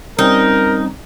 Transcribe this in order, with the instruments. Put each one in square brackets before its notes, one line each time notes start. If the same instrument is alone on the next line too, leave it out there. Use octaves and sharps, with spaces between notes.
[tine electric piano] G3 C4 C#4 [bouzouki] D#4 [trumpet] A#4